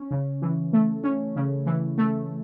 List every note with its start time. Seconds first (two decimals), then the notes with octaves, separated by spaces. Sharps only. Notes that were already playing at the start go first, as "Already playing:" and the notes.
Already playing: C#4
0.11 C#3
0.42 E3
0.73 A3
1.04 C#4
1.36 C#3
1.66 E3
1.98 A3